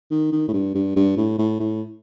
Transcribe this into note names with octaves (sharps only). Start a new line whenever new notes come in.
D#3
D#3
A2
G2
G2
G2
A2
A2
A2